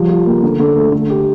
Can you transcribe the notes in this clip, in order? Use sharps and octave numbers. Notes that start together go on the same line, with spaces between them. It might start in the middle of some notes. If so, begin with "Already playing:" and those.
Already playing: F3 G3
F4
A#3
D3
D3
A3
D3
G4